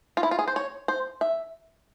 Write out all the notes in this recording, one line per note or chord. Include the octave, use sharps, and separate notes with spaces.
F4
E4
F4
G#4
C5
C#5
C5
E5